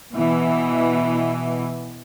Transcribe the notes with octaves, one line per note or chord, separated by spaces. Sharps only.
B2 E3